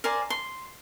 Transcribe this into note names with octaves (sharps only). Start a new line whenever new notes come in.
A#4 C5 D5 G#5
C6